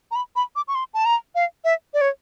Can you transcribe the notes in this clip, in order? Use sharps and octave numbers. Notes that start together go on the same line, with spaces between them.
A#5
B5
B5
D6
C#6
C6
A5
A#5
F5
E5
D5
C#5